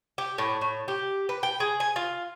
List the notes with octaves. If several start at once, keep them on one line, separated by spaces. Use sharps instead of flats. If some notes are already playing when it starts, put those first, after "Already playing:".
G4
A2
A2
G4
B4
G5
G#4
G#5
F4